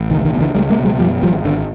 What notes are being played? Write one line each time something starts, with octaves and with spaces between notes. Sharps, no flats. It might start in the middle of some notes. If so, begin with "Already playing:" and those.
Already playing: A1
C#2 D#3
D#3
B2
D3 E3
C#2 G3 A3
G#3 A#3
B2
F#3 G#3
F#2 F3 G3
G#1 F3 G3
G#1 D3